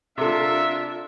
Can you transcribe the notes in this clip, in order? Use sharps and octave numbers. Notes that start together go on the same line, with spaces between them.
C3 D4 F4 A4 A#4 E5